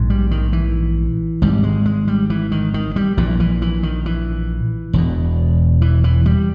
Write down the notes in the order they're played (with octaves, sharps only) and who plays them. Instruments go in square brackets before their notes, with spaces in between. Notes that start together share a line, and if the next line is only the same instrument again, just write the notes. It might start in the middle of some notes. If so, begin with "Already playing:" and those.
Already playing: [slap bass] A#1 G#2
G3
D#3
E3
G#1 G#2 G3
G#3
G#3
G3
E3
D#3
D#3
G3
A#1 A#2 E3
E3
E3
D#3
E3
E1 E2 B2
E3
E3
G3